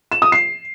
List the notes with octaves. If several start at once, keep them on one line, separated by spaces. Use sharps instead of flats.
E7
D#6
C7